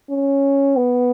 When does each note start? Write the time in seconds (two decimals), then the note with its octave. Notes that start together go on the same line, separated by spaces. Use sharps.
0.10 C#4
0.76 B3